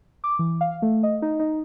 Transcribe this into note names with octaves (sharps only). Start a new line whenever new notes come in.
D6
E3
F5
A3
D#5
D#4
D#4